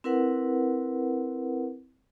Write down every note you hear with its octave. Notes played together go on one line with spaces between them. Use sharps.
C4 E4 A#4 B4 F#5